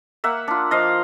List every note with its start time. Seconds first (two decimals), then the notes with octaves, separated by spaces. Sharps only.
0.24 A#3 E5 F#5
0.48 D4 F4
0.71 F3 D#5 F5